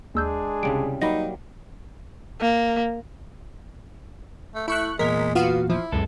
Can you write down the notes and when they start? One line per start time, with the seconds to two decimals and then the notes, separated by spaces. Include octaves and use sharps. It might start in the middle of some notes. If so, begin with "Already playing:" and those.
0.15 D#2 G#3 D4 G#4 E6 G6
0.63 C2 C#3 G3 D7
1.02 F#3 G3 A#3 D#4 B5 A#6
2.41 A#3
4.55 A3
4.68 A3 E4 C#6 F#6
4.99 E2 A#2 G#3 A#4 B6
5.35 B3 F4 F#4 F5
5.70 F3 E4
5.92 C#2 F#2 G#3 A4